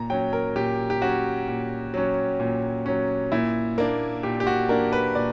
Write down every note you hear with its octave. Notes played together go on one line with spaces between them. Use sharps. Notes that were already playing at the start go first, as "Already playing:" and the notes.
Already playing: A#2 A#5
F#3 C#4 G5
A#4
A#2 G4
G4
F#3 C#4 F#4
A#2
F#3 C#4
A#2
F#3 C#4
A#2 E4
A#3 D4
A#2 G4
G4
F#4
A#3 D4 A#4
B4
A#2 D5